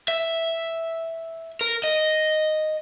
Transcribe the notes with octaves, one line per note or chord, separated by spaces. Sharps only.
E5
A#4
D#5